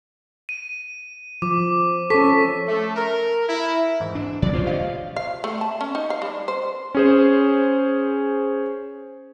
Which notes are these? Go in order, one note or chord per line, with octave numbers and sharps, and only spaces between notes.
D#7
F3 D6
C#4 A4 C#6 B6
A3
A#4
E4
G#2 E3
D4
A#2 F3 F#3 D5
C#3 F4 C5 C#5
D2 G4 D#5 F5
F5
A3
A5
C#4
D#4
F5
G3
C5
C#4 G#4 C5